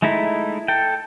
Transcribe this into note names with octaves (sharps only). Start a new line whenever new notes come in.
G#3 A3 D#4 E4
A4 G5